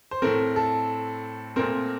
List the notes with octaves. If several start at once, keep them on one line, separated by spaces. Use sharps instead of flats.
C5
A2 A3 C4 A#4
A4
A#2 A3 C4 A#4